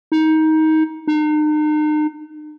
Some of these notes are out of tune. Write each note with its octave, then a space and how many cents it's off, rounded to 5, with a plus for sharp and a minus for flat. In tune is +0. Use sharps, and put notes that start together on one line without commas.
D#4 +20
D#4 -40